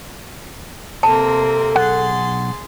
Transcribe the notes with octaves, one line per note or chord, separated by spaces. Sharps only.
C3 A#3 C4 A4 A5
B1 G#4 F#5 C6 A6